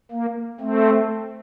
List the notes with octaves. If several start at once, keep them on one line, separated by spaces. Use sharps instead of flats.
A#3
A3 C4